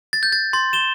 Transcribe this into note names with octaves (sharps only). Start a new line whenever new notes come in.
A6
G6
A6
C6 A6
E7 G7